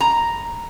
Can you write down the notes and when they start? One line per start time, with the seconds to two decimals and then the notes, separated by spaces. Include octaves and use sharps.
0.01 A#5